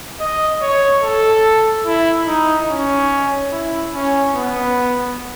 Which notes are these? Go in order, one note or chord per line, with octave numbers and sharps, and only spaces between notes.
D#5
C#5
A4
E4
D#4
C#4
E4
C#4
B3